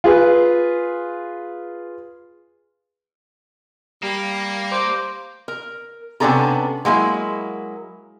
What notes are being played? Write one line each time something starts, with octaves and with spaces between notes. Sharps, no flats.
F4 G#4 B4
G3 A#3
C5 D6
A#4
C3 B3 C#4 D4 A4 A#5
F#3 G#3 A#3 E4